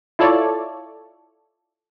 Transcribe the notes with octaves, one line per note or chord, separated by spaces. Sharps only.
E4 F4 A4 C#5 D5